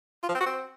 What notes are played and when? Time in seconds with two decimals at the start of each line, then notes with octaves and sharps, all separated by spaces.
0.23 F4
0.29 F3
0.35 C4
0.41 F#4
0.46 C4